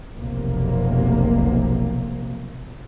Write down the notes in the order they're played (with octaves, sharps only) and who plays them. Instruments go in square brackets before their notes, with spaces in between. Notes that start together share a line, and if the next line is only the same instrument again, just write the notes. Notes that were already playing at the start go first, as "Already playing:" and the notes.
[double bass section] F1 B1 C3 A#3